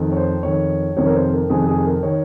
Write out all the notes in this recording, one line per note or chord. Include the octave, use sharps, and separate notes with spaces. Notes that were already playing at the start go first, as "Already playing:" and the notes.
Already playing: F2 D#3
C#5
C5
F2 D#3 C#5
F2 C3 D#3 C#5
A#4
C5
A#4
F2 C3 D#3 G#4
G#4
A#4
D#3 C#5